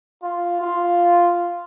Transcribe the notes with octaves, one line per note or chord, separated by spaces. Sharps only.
F4
F4